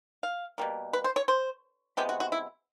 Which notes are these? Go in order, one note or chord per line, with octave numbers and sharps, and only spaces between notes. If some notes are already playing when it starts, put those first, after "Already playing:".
F5
B2 G3 A#3
B4
C5
C#5
C5
C3 F3 G#3 B3 G4
F#4
F#4
E4